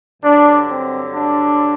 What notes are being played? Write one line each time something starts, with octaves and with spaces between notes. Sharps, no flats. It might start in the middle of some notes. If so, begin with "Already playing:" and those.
G2 D3 F#3 D4
C4
D4